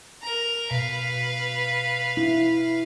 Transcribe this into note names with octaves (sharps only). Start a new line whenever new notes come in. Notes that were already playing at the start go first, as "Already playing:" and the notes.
A#4 A#5
B2 B4 F5
E4